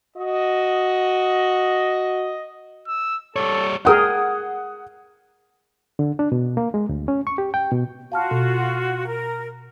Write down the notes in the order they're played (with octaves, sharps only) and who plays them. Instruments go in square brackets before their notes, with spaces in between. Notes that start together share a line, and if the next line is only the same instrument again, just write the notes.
[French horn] F#4 [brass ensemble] D#5
[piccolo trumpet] E6
[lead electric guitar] G3 C#5 [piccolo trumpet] A4
[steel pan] G#4 A#4 G5 [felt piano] F#5 D#6
[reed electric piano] D3
D4
B2
A#3
G#3
D2
C#4
C#6
G4
G5
B2
[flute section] F4 F#4 [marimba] F5 A5 F6
[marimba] B2
[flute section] A#4